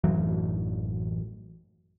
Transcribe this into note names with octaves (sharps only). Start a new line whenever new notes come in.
A1 F#2 E3 F#3